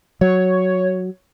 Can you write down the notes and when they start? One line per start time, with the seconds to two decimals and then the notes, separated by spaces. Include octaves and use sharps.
0.21 F#3 C#5